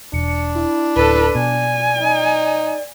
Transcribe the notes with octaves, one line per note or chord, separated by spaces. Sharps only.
E1 D4 C#7
E4
D1 A4 B4
B2 D5 G#5
D#4